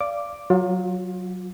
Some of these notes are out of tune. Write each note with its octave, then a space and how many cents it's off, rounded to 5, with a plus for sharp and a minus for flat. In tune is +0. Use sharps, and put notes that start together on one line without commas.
D5 -10 F5 -25 D6 +0
F#3 +0 F4 +35